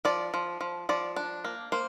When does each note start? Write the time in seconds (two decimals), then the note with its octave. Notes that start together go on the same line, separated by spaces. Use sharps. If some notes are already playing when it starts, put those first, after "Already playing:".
0.05 F3 D5
0.34 F3
0.61 F3
0.89 F3 D5
1.16 D4
1.44 A#3
1.72 A#3 C5